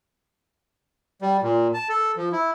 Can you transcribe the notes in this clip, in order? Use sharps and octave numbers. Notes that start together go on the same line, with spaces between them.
G3
A#2
A5
A4
F3
E4